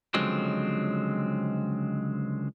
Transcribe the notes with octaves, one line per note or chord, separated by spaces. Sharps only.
C#2 D3 F3 F#3 G#3 C4